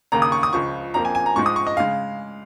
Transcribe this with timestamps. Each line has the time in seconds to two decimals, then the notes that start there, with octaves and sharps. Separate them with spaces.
0.12 D#2 C#3 A#3 A#5
0.22 D#6
0.32 C#6
0.43 D#6
0.53 C#2 C#3 F3 C#6
0.94 F2 F3 A#3 A#5
1.05 G#5
1.15 G#5
1.26 A#5
1.36 G#2 F3 G#3 C#6
1.46 D#6
1.56 C#6
1.67 D#5
1.77 C#3 G#3 F5